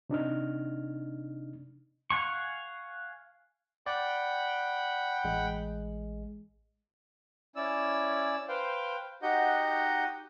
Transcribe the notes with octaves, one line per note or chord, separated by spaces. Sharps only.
C3 D4 D#4 F6
F5 F#5 G#5 C#6
D5 F#5 G5 B5
A1 G#3
C#4 E4 D5 E6
B4 C5 F5 G5
D#4 F#4 G4 D#5 F#5 G6